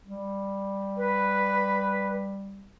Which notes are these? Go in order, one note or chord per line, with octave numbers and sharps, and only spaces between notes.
G3
B4